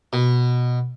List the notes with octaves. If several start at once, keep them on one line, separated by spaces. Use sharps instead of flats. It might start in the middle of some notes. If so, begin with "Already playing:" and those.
B2